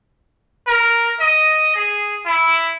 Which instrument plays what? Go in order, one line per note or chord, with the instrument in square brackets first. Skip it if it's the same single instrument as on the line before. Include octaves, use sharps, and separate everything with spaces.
[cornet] A#4
D#5
G#4
E4